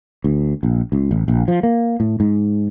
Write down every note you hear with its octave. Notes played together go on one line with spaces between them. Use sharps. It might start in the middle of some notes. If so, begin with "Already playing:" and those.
D2
A#1
C#2
A1
A#1
F3
A#3
A2
G#2